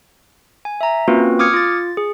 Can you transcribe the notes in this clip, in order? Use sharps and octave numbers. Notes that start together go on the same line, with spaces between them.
G#5
E5 A#5
A#3 C4 C#4 F4 F#4 B4
D6 D#6 F6 G#6 C#7
F4 A6
G#4